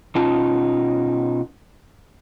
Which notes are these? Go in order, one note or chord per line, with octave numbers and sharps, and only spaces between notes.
B2 C#4 D#4 F4 A5